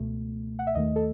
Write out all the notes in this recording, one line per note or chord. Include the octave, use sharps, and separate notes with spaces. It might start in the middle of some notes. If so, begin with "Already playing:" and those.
Already playing: C#2 B2 A3
F#5
E5
D#2 D#3 A3 D#5
A4